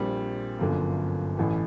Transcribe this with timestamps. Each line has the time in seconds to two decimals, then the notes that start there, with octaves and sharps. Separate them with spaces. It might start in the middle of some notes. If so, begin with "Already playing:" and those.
Already playing: A#1 A#2 G3 C4
0.59 G1 F#2 D3 F3 A#3
1.37 A1 A2 E3